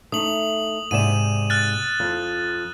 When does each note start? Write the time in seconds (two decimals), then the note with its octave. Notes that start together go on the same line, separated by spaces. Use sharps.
0.12 A3 D#4 D#6 F#7
0.91 G#2 C3 D5 D#7 E7
1.50 F6 F#6 A6
2.00 F2